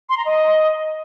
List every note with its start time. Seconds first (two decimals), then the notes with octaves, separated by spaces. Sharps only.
0.09 C6
0.17 A#5
0.25 D#5